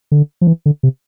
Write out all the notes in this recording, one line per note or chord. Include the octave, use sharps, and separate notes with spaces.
D3
F3
E3
D3
C3